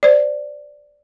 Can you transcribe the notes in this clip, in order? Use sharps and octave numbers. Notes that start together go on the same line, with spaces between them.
C5 D5